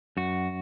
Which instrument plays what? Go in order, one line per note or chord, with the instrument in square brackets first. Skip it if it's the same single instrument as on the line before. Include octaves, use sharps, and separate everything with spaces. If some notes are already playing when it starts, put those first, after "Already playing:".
[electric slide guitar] F#2 F#4